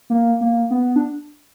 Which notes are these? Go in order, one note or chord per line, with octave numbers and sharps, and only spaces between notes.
A#3
A#3
B3
D4